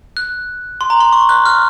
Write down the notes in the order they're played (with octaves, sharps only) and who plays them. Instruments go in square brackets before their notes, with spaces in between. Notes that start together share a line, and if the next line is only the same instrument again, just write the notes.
[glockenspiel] F#6
C6
A#5
C6
C#6
F#6
F6